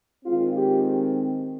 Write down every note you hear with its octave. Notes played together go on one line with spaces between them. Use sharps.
D#3 G#3 C4 F4
G4